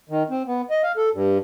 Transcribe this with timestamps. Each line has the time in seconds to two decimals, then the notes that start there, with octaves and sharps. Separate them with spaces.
0.09 D#3
0.30 C4
0.47 B3
0.70 D#5
0.83 F5
0.97 A4
1.14 G2